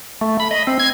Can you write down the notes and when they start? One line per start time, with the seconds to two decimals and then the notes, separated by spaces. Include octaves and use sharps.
0.21 A3
0.40 B5
0.51 D#5
0.67 C4
0.80 G#6